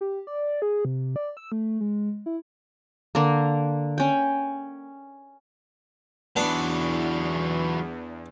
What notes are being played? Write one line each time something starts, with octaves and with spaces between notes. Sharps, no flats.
G4
D5
G#4
C3
D5
E6
A3
G#3
E4
D3 A#3
C#4 G5
E2 E3 F#3 B3 D4